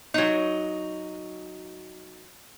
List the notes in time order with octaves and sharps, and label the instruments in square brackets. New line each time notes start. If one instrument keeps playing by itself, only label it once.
[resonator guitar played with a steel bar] F#3 D#4